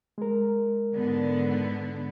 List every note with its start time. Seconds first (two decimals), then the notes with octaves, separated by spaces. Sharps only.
0.18 G#3 A#4
0.94 G#2 D3 B3